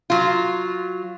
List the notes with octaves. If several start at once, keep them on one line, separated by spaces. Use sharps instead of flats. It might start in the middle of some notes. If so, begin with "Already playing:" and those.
F#3 F4